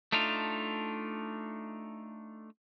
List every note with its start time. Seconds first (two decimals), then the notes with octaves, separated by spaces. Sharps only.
0.12 A3 D4 D#4 F4